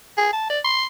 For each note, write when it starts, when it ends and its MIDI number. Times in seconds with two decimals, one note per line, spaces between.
0.18 0.28 68
0.33 0.47 81
0.50 0.59 74
0.65 0.86 84